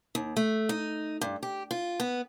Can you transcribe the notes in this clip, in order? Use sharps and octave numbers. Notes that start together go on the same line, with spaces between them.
D#2
A3
D#4
G2
G4
F4
B3